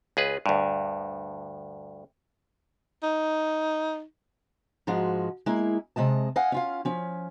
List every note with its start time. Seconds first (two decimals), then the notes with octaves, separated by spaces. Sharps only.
0.17 C#2 G#4 B4
0.46 D2 G2
3.03 D#4
4.87 G#2 F3 G#3 F#4
5.46 G#3 A#3 E4
5.96 C3 G#3 D#5 A5
6.36 D#5 F5 F#5 G#5
6.52 C#4 F4 F5
6.85 F3 C#4